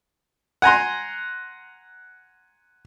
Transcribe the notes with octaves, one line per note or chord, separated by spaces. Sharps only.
F#5 G#5 A#5 C6